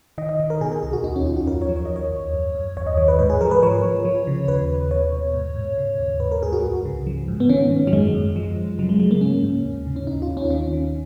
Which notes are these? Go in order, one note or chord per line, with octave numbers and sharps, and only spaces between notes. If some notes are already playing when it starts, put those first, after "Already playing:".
D#3 D#5
D#5
D#3
A#4
B2 G#4
G#4
C#2 G#4
F#4
D#2 D#4
C#4
D#2 F4
F#4
F#2 A#4
C#5
F3
C#5
D#2 D#5
C#5
D#2
F#2
F#2
D#2 C#5
D#5
D#3 C#5
B4
G#2 B4
G#4
F3 A#4
B4
F3 C#5
F3
F3
C#3
D#2 B4
D#2
B2 C#5
B2
G#2
G#2
C#3
D#2
G#2 B4
A#4
G#2 G#4
F#4
C#2
C#3
F3
G#2
B3
D#3 C#4
D#3
F#3
F#2 G#3
F#2
F3
F3
C#3 F#3
G#3
C#3 G#3
A#3
G#2 C#4
G#2
D#2
C#3
C#4
D#2 D#4
F4
D#2
C#4
D#4
D#3 C#4
D#3